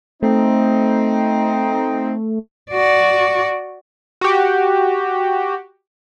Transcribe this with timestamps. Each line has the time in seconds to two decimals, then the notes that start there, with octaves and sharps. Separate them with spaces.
0.23 A3 C4 D#4
2.72 F#4 D5
4.21 F#4 G4